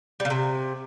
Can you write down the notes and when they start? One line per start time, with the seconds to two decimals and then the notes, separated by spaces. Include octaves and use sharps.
0.20 G3
0.25 C#3
0.30 C3